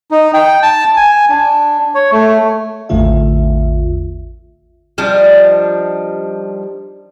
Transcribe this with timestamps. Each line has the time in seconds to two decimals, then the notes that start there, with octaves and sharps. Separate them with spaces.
0.11 D#4
0.34 G5
0.63 A5
0.97 G#5
1.29 D4
1.95 C#5
2.12 A3
2.89 A1 E2 D3 A3 F4 E5
4.98 F3 G3 D4 D#4